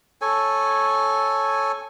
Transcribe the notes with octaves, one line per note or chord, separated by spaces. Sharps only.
A4 C#5 G#5